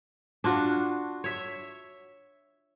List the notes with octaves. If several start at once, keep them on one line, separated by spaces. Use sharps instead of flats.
D4 F4 F#4
C#5 E5